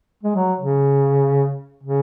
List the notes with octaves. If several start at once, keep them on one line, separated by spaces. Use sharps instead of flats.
G#3
F#3
C#3
C#3